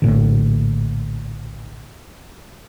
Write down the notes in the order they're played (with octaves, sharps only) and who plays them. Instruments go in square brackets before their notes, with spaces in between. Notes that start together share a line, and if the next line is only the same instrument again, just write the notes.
[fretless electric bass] A#1 A2 D3